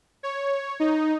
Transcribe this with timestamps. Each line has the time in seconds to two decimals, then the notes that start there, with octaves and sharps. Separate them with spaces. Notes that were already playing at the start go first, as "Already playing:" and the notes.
0.23 C#5
0.80 D#4